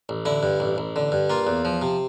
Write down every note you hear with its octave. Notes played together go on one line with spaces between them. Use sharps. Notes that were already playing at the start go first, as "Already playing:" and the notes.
A1
D3 E4
G2
A1
A1
D3
G2
A#3 F4
E2
F3
C3